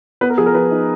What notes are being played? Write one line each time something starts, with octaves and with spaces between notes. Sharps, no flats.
B3 B4
A#4
F3 G#4
A#4
F3 B4
D#4